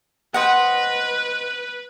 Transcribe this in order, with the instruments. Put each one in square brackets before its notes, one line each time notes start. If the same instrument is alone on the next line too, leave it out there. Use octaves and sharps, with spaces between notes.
[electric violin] B4 [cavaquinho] C5 D#5 F#5